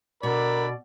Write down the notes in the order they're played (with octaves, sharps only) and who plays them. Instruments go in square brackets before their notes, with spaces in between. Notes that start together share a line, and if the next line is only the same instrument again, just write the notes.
[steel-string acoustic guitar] B2 [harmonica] D3 B5 [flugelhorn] A#4 [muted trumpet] D5